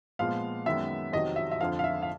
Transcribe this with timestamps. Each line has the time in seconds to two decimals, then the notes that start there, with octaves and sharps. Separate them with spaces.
0.19 A#2 F3 G#3 B3 F5
0.66 F#2 D#3 G#3 B3 E5
1.12 F2 C3 D#3 F#3 D#5
1.36 E5
1.51 E5
1.61 F2 D3 F3 F5
1.79 F5
1.84 E5
2.02 F5